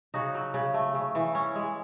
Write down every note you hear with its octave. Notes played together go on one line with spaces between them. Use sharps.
C#3 D#4 F#4
F#3
C#3
A3
C#3
E3
C#4
G#3